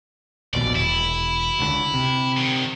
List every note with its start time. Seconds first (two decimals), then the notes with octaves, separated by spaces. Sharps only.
0.54 A#1 D#2 B2 D5
0.75 E1 E4
1.59 C#2 D3
1.94 C3
2.37 D3 D#3